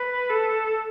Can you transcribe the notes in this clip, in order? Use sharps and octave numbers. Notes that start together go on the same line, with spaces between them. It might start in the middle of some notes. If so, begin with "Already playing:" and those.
Already playing: B4
A4